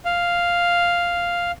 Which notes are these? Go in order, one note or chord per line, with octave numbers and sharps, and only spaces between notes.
F5